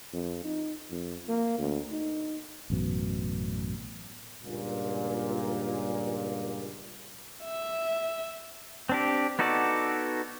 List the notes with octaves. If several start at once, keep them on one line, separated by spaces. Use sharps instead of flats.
F2
D#4
F2
A#3
D2
D#4
A1 F#2 B2
C#2 G2 A#2
E5
C4 D4 G4
B3 D#4 F#4 A4 D5